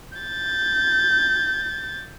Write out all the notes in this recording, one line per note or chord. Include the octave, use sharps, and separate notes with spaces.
G6 A6